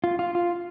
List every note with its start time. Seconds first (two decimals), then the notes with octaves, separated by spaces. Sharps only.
0.04 F4
0.19 F4
0.35 F4